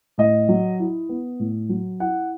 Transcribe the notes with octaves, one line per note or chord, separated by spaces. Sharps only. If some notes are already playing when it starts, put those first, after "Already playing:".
A2 D#5
F#3
E4
B3
A2
F#3
E4 F#5